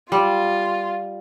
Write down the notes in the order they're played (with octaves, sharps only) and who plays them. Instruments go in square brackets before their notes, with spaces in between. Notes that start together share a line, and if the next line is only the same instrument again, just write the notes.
[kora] G3 [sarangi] F4